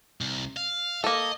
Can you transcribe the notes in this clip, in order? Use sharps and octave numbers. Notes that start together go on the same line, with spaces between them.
C2
F5
A#3 A4 D#5